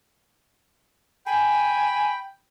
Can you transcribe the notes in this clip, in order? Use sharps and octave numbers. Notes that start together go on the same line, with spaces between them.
G5 G#5 B5